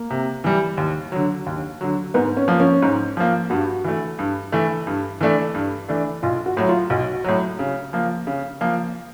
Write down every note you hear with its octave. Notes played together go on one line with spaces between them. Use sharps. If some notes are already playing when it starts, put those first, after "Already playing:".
Already playing: A#3
C3
E3 G3
D#2
D3 F#3
D#2
D3 F#3
G#2 B3
C#4
F3 A#3
C#4
G#2
F3 A#3
G2 F#4
E3 A3
G2
E3 A3
G2
E3 A3 D4
G2
E3 A3 D4
B1 F4
F#4
A2 F#3
F4
B1 F#4
A2 F#3
C#3
F3 A#3
C#3
F3 A#3